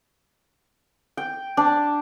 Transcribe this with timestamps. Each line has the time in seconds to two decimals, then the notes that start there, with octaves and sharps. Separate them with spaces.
1.17 G5
1.57 D4